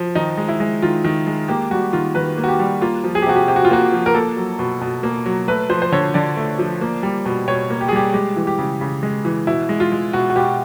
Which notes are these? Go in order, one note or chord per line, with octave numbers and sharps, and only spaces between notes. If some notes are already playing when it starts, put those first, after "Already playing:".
Already playing: F3
D#3 D#4
G#3
E4
G#3
D#3 F4
D#3
G#3
A#3 G4
G3 F#4
D#3 F4
D#3 B4
A#3
F#4
G4
G3
A#3 F4
F3
G#4
G4
C3 F#4
G4
C3 G4
F#4
F4
A#3 F#4
F3
A#4
A#3 A4
F#3
B2
B2
A#3
F#3
A3 B4
F3 C5
C5
D3 C#5
D3 D5
A3
F3
A#3
G3
B2
B2 C#5
A#3
G4
G#4
G3 G4
G#3 G4
E3
G4
C#3
C#3
G#3
E3
B2 E4
G#3
F4
G#3
B2 F#4
F#4
B2 G4